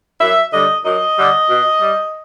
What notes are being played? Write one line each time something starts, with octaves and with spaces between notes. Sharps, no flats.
F#2 E5
D3 G3 D#5
F#2 D#5
D3 G3
B2
G3